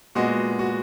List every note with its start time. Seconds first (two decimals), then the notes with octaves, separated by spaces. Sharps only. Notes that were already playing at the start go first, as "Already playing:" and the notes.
0.15 A#2 G#3 B3 F#4
0.59 F#4